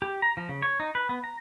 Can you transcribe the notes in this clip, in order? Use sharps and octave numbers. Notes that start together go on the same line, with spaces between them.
G4
A#5
F3
C#3
C#5
D#4
B4
B3
A#5